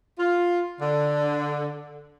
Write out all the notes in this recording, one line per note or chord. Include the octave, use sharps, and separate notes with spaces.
F4
D3